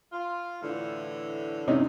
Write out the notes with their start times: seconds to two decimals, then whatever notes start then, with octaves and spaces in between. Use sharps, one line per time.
0.12 F4
0.62 A2 D3 E3
1.68 C3 C#4 D#4